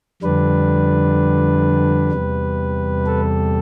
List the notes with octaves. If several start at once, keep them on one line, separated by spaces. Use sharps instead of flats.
F2 D3 G3 D4 B4
E2 C3 G3
A4